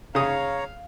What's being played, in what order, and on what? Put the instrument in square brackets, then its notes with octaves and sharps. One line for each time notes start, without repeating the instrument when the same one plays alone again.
[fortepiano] C#3 D#6 [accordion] C#5 A#5 [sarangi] F5